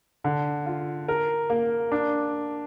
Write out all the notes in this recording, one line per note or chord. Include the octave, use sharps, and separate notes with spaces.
D3
F4
A#4
A#3
D4